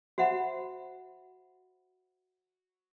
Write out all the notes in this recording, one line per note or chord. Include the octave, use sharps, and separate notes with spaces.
F#4 C5 E5 F#5 B5